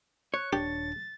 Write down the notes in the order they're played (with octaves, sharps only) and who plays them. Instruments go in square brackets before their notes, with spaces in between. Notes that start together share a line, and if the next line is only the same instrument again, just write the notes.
[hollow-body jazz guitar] C#5 [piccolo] F#6
[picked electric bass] D#1 D4 [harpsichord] G4 [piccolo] A6